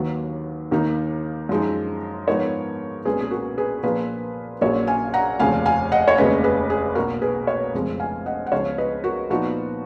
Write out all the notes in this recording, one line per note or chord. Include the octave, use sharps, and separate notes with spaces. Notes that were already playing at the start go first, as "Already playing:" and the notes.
Already playing: D#2 D#3 F#3 A#3 B4
D#2 D#3 A#3 D#4
F#2 F3 G#3 D#4
G#2 F3 B3 D#4 A#4 C#5
B1 A#2 G#3 C#4 G#4 B4
G#4
F#4 A#4
G#4 B4
A#2 F3 A#3 F4 G#4 B4
A#1 A#2 F#3 C#4 F4 A#4 C#5
F5 G#5
F#5 A#5
F1 D#2 C#3 F3 F5 G#5
F5 G#5
D#5 F#5
C#5
F1 D#2 C#3 G#3 C#4 B4 D#5
G#4 B4
G#4
B1 B2 A#3 F#4 A#4
G#4 B4
C#5 F5
F1 F2 C#3 F3 G#3
F5 G#5
D#5 F#5
F#5
C#2 C#3 F3 B3 C#5 F5
B4 D#5
F#4 A#4
A#2 F3 B3 D#4 F#4